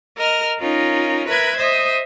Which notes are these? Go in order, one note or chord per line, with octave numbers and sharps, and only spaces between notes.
A#4 D#5 F6
C#4 D#4 F4 A#4
A#4 B4 E5 F#6 G#6
C5 D#5 E5 D#6